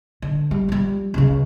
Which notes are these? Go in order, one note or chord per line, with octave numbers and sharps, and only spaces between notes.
D3
G3
F3 G3
C#2 C#3